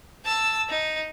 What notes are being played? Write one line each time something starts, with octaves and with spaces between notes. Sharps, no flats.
A5 E6
D#4